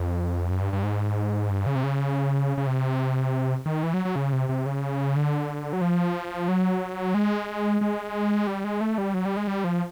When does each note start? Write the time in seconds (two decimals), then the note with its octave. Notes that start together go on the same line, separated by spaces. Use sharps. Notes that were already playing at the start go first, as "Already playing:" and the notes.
Already playing: F2
0.50 F#2
0.61 G2
0.73 G2
0.84 G#2
1.50 G2
1.66 C#3
1.75 C3
1.84 C#3
2.58 C#3
2.67 C3
3.66 D#3
3.83 E3
3.94 F#3
4.05 F#3
4.16 C#3
4.33 C3
4.49 C3
4.66 C#3
5.16 D3
5.73 F#3
5.81 F3
6.48 F#3
7.14 G#3
7.81 G#3
8.47 G3
8.64 G#3
8.81 A3
8.98 G3
9.14 F#3
9.25 G3
9.37 G#3
9.47 G3
9.64 F3